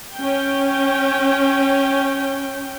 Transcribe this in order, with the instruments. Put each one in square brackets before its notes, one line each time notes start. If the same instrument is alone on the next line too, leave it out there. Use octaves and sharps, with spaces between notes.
[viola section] C#4 G5